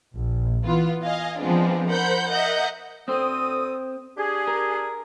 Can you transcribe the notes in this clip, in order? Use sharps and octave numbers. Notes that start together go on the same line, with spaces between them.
A#1
E3 B3 F4
D#5 F5 G#5
F3 G#3 B3 C4 D4 F4
A#4 C5 F#5 B5 G6
A#4 D#5 E5 F#5 G6
D2 C4 A4 C5 D#6
D4 G4 G#4
A#4